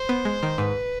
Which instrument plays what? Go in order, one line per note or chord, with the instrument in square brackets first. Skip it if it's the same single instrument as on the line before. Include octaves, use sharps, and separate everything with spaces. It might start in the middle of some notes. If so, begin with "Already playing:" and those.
Already playing: [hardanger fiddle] C5
[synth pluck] B3
G#3
D#3
[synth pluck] G#2 [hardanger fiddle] B4